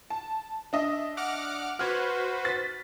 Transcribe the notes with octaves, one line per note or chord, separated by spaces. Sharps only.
A5
D4 D#5 E5
F#5 D6 F6
F#4 B4 C5 F6 G#6
A6 B6